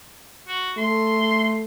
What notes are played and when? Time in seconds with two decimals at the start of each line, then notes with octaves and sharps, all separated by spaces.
0.48 F#4
0.78 A3 C6